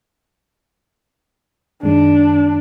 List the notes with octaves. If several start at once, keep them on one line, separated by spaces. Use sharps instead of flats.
F#2 D#3 G#3 D4